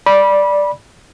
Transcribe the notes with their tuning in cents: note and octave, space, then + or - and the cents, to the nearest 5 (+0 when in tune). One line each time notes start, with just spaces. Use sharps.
D5 +0 B5 -20